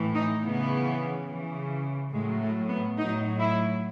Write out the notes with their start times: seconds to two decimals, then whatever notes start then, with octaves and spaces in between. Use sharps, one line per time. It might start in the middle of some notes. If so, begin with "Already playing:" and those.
Already playing: A2 E3
0.14 D#4
0.43 C#3 E3 B3
1.29 C#3 E3
2.12 A2 F#3 G#3
2.42 A3
2.70 B3
2.98 A2 F#3 D#4
3.40 E4